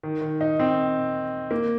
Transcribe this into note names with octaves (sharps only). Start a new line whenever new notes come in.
D#3
D#3
D#4
C4
A#3